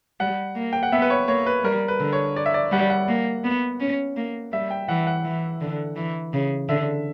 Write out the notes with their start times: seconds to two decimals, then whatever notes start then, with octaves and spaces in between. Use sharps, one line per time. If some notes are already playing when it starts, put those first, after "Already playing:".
0.20 G3 F#5
0.56 A#3
0.73 G5
0.83 F#5
0.92 B3 E5
1.02 B4
1.10 C#5
1.28 A#3 C#5
1.46 B4
1.64 G3 A#4
1.88 B4
2.00 D3
2.13 C#5
2.36 D5
2.46 E5
2.54 D5
2.72 G3 F#5
2.90 F#5
3.08 A#3
3.44 B3
3.80 C#4
4.17 A#3
4.52 G3 E5
4.70 G5
4.89 E3 F#5
5.07 F#5
5.25 E3
5.61 D3
5.96 E3
6.33 C#3
6.69 D3 E5